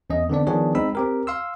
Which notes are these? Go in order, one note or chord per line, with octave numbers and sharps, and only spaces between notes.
E2 C#4 D#5
D3 E3 B3 C4 D4 D5
D#3 F3 B3 D4 G#4 C#5
G#3 C4 D#4 B5 E6
C4 G4 A#4
F5 C6 E6